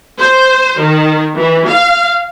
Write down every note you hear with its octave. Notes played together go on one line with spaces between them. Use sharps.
C5
D#3
E3
F5